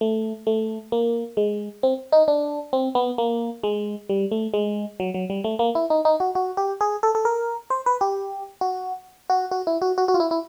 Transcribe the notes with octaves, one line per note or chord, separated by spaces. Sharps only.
A3
A3
A#3
G#3
C4
D#4
D4
C4
B3
A#3
G#3
G3
A3
G#3
F#3
F#3
G3
A3
A#3
E4
D#4
D#4
F#4
F#4
G4
G#4
A4
A4
A#4
C5
B4
G4
F#4
F#4
F#4
E4
F#4
F#4
F#4
F4
E4
E4